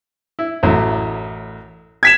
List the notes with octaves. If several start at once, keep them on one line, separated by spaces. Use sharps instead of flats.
E4
A1 F#2 A2
G#6 B6 E7